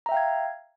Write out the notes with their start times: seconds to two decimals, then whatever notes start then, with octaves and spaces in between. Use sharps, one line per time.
0.06 A#5
0.09 E5
0.11 G5
0.14 F5
0.17 G#6